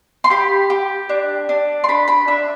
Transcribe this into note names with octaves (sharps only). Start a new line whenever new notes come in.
C6
G4 B5
G4
D4
D4
C6
D4 B5
B5
D4 E5